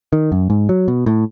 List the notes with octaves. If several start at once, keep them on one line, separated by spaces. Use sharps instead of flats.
D#3
F#2
G#2
F#3
B2
A2